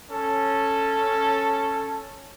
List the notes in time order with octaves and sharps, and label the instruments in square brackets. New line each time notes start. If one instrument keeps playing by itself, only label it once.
[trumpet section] C#4 A4